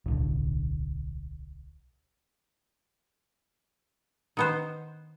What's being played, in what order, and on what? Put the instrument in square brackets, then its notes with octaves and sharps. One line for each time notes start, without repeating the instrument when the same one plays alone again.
[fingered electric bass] D1 B1 D3
[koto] D#3 B3 C5